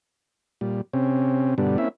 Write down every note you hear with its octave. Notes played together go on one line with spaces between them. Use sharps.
A#2 G3
C3 C4 C#4
G2 B2 D3 G3 B3 D4
A#3 C4 C#4 E4 E5